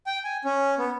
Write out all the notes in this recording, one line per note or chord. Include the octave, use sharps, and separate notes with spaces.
G5
G#5
C#4
B3